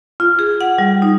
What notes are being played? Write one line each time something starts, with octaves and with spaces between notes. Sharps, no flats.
F4
G#4
F#5
G3
D#4